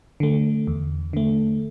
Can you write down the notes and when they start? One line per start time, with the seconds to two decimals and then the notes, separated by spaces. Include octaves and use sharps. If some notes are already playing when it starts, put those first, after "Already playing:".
0.20 D3 A3
0.67 E2
1.13 D3 A3